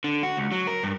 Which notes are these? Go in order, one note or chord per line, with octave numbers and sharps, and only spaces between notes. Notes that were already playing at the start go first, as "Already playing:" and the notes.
D3
F#4
C#2
F#3
A#4
G2